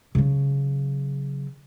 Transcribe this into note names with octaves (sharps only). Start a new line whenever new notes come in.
C#3 F#3